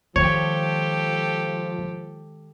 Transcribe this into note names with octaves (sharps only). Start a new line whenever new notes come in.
D#3 F3 G#3 G4 A4 C#5